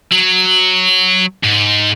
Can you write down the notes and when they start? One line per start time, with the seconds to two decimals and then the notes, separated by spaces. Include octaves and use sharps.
0.12 F#3
1.43 G#2